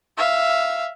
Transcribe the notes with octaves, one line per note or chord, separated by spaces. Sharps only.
E5 F5